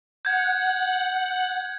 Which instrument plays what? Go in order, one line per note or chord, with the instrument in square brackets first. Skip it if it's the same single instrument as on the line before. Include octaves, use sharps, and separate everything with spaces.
[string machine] F#5 [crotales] G6 G#6